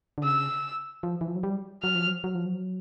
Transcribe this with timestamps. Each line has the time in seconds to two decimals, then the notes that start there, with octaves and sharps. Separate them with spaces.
0.18 D3
0.23 C#3 E6
1.03 F3
1.21 E3
1.28 F3
1.36 F#3
1.43 G3
1.83 F#3 F6
1.95 F3
2.07 F#3
2.24 F#3
2.35 F3
2.46 F#3